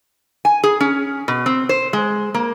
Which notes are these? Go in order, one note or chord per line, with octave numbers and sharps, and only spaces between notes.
G#5
G#4
C#4
B2
C4
C5
G#3
A#3